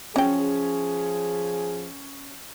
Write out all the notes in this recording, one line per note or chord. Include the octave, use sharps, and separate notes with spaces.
F3 F#3 C#4 G#4 G5